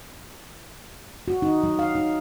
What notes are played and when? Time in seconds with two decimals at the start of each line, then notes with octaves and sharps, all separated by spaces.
1.28 F#4
1.42 D#4
1.63 F#3
1.79 F5
1.95 D#4